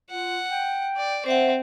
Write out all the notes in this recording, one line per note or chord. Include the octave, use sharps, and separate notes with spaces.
F4 F#5
G5
D5
C4 C5 E5 F#5